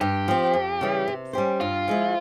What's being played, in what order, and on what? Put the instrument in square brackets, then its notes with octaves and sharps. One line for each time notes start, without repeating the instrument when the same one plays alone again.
[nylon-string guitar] G2 [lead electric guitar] G4
[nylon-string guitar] F3 C4
F2
C#3 E3 G3
C3
G3 C#4 G4 C5
[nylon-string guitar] G2 [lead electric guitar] F4
[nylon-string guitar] F3 G#3 E4